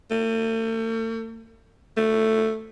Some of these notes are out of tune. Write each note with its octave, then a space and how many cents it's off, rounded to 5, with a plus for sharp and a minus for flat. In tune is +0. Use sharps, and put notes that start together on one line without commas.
A3 +45
A3 +5